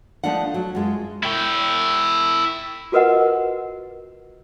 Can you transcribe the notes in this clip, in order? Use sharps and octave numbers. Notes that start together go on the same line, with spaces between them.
F3 A3 D4 D#4 F#5
F#3
F#2 G#3 F4
E4 G5
F4 F#4 A#4 B4 D#5 F#5